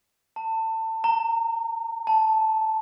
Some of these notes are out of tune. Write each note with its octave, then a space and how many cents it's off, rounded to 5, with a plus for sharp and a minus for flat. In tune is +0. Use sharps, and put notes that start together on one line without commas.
A5 +25
A#5 -25
A5 -5